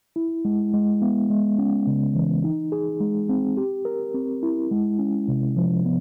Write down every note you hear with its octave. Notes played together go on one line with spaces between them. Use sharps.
E4
G#3
G#3
B3
G#3
C#4
C#3
E3
D#4
G#4
G#3
C4
G4
A#4
C4
E4
G#3
C#4
C3
F3
B3